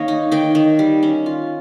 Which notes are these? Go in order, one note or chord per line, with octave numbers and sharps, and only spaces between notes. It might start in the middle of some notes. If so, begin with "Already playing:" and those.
Already playing: D#3 A#3 C#5 D#5 F5
D#4
D#3 G5
D#3
G3
C#4
F4